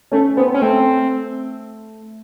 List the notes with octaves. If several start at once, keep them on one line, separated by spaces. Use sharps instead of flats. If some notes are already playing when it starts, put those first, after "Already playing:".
A3 C#4
B3 C4
C#4
A3 C4